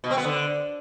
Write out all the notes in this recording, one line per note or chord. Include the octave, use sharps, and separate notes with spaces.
B2
C4
B3
D3